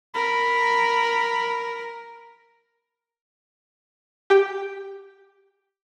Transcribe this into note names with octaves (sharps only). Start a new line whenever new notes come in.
A#4 B5
G4 G5